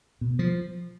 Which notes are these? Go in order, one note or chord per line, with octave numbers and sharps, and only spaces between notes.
B2
F3